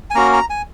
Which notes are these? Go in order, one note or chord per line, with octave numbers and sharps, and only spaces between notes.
G#5
A#3 C#4 F#4 A#5
A#5
G#5